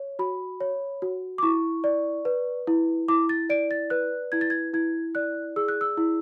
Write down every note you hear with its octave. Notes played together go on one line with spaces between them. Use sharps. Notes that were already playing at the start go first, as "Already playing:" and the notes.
Already playing: C#5
F#4 B5
C#5
F#4
D6
E4 C#6
D5
B4
E4
E4 D6
A6
D5 D7
A6
B4 F#6
E4 G#6
A6
G#6
E4 G#6
D5 F#6
G#4 E6
F#6
E6
E4